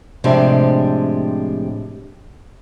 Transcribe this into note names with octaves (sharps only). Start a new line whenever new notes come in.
A2 C3 F3 G#3 D4 G4